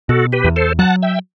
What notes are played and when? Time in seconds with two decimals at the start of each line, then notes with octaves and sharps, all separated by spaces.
0.09 B2 F#4 A4
0.33 G4 B4
0.44 E2
0.56 A4 C5
0.79 F#3 F#5 A5
1.03 E5 G5